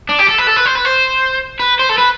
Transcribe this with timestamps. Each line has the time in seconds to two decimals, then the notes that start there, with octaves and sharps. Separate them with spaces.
0.09 D4
0.19 G4
0.29 A4
0.38 B4
0.47 A4
0.56 B4
0.65 C5
0.75 B4
0.85 C5
1.60 B4
1.79 C5
1.89 A4
1.98 B4